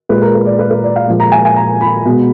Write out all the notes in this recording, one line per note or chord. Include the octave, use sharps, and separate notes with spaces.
A#2 G#3 B4
A#4
B4
D5
B4
B4
D5
F5
A#2 F3 G#3
A#5
G#5
G#5
A#5
B5
B2 G#3